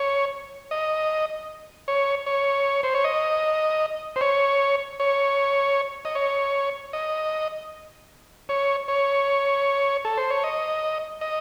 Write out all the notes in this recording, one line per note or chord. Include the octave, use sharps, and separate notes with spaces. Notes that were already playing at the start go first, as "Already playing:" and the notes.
Already playing: C#5
D#5
C#5
C#5
C5
C#5
D#5
C5
C#5
C#5
D#5
C#5
D#5
C#5
C#5
A4
C5
C#5
D#5
D#5